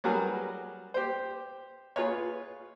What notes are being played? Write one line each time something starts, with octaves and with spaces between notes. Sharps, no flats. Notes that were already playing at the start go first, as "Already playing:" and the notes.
F#3 G3 F#4 G#4 A#4 B4
G4 C5
F4 G#4 B4 C#5